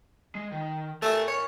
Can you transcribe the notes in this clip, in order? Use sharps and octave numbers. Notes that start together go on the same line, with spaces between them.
G#3
D#3
A3 A#4 G#5
C#5